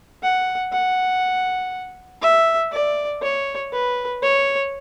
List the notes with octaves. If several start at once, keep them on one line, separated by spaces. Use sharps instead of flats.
F#5
F#5
E5
D5
C#5
B4
C#5